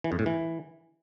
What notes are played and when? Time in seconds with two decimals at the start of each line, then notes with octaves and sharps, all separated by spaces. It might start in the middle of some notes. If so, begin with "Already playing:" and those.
0.04 E3
0.12 F2
0.19 A2
0.26 E3